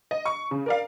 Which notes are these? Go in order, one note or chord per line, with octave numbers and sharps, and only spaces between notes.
D#5
C#6
C#3
A#4 D5 F5